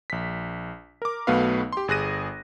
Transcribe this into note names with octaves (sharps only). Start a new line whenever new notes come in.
A#1 B6
A#4 D6
B1 A3 B3 F#4 B4 F5
G4 C6
G1 G#4 F#6 A#6 D#7